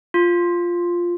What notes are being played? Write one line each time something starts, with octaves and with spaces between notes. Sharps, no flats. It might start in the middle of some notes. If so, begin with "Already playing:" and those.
F4